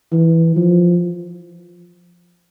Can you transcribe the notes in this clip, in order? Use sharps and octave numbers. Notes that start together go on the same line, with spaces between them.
E3
F3